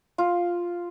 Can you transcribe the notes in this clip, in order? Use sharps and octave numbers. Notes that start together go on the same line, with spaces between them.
F4